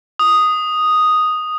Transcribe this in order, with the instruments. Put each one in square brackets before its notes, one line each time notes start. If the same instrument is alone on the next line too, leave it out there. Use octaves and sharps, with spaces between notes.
[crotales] D#6